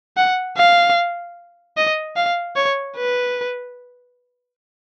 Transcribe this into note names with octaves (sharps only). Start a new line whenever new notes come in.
F#5
F5
D#5
F5
C#5
B4